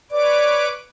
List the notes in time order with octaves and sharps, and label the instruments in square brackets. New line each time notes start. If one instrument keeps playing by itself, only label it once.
[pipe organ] B4 C#5 D6 [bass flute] D5